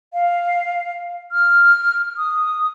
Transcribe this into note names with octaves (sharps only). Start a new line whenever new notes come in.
F5
F6
D#6